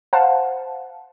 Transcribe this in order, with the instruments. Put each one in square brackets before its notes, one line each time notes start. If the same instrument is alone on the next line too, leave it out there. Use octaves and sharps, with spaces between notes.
[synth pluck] C5 F5 F#5 A5